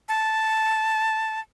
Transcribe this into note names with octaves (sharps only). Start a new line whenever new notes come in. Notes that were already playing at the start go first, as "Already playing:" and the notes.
A5